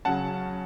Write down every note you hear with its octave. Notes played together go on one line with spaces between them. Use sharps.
C#3 F#3 C#4 F#5 A5